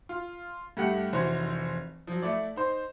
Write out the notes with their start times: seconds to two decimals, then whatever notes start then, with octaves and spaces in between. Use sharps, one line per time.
0.09 F4
0.77 G2 A3 G4 F#5
1.13 F1 E3 F#4 C5 C#5
2.07 F3 F#3
2.22 A3 E4 D5
2.56 D#4 C5